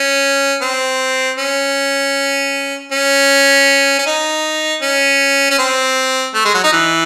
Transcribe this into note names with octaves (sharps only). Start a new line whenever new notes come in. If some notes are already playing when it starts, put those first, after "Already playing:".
Already playing: C#4
C4
C#4
C#4
C#4
D#4
C#4
C#4
C4
A3
G#3
F#3
D#4
E3